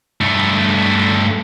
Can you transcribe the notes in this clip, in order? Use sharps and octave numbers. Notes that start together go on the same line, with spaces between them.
G2 A3